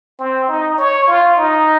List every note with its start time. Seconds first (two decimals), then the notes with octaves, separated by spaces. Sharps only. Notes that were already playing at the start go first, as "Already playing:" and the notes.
0.19 C4
0.48 D#4
0.78 C#5
1.07 F4
1.37 D#4